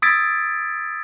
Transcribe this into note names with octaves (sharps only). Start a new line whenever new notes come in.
D#6 E6 G#6 A6 B6 D7